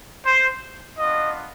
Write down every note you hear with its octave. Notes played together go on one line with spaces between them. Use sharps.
C5
B3 D4 F4 D#5